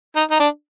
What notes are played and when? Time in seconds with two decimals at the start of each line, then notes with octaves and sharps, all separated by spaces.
0.16 D#4
0.31 D#4
0.40 D4